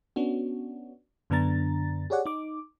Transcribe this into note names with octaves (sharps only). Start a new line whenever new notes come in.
B3 C#4 D4 F#4
F#2 D3 B3 D4 A#5 A6
G4 G#4 C#5 D5 F#5
D#4 D6